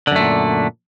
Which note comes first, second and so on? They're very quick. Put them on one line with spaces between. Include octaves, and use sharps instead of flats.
D3 F#2 A3 A#2